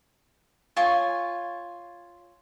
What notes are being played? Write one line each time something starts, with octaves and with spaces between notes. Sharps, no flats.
F4 C#5 G#5